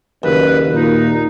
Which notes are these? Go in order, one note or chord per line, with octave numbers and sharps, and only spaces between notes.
F#1 D#2 B4
A#2 D#4